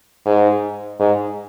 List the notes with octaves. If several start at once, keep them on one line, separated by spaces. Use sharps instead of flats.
G#2
G#2